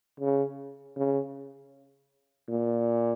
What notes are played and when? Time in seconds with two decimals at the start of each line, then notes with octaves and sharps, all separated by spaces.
0.20 C#3
0.96 C#3
2.49 A#2